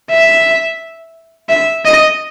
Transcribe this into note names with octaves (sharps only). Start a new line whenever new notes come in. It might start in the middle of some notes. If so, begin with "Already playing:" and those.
E5
E5
D#5